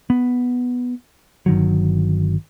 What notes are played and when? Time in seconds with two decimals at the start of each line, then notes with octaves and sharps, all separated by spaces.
0.10 B3
1.46 G1 D#3 F#3